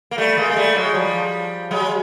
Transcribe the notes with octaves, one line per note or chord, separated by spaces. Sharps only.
A#3
G3 A3
G#3 A#3
A#3
G3 A3
F#3 G#3
F3 G3
F#3 G#3